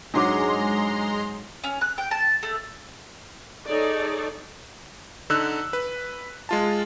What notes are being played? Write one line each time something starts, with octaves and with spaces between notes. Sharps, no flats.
G#2 F#3 G#3 D4 A#5 C6 D6
C#4
F#6
G5
A5
A3
D#4 G#4 A4 C#5 D5
D3 D#4 E6 F#6
B4
G#3 F4 A5